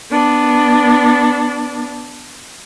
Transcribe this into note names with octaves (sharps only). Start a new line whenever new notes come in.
B3 D4